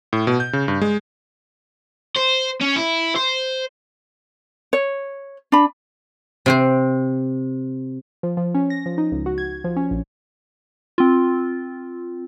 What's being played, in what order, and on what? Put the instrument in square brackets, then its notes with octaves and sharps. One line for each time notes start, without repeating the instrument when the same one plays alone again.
[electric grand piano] A2
B2
G6
C#3
G2
G#3
[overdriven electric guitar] C5
C#4
E4
C5
[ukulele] C#5
D4 B5
[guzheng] C3 C4 C5
[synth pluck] F3
F3
C#4
A#6
F3
D#4
C#2
F#4
G#6
F3
C#4
A#1
[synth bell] C4 F4